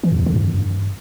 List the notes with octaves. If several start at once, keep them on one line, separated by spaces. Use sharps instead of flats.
E3
F2
E2
D3
G2